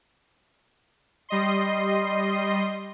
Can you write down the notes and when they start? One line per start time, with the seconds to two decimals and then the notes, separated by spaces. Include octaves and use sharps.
1.29 G3 D#5 C6